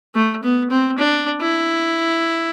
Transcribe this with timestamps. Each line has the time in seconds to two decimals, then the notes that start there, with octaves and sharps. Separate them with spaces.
0.15 A3
0.43 B3
0.71 C4
0.98 D4
1.41 E4